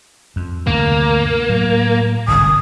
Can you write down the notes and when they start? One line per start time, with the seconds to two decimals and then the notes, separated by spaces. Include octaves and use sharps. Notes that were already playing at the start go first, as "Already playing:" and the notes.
0.36 F2
0.67 D2 G2 C3 A#3
1.49 A2 F#3
2.28 G1 C2 G#2 D#6